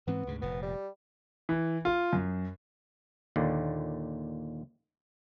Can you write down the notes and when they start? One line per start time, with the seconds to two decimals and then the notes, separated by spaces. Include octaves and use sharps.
0.07 G#2 E3 B3 C4
0.27 D2 G#2 C#3
0.41 F1 A#2 B3
0.62 G3
1.49 E3
1.85 F4
2.13 F#2
3.36 D#2 A#2 D3